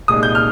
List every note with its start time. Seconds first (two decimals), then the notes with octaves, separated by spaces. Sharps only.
0.08 C2 A#2 G#3 D#4 D#6
0.23 G6
0.35 F6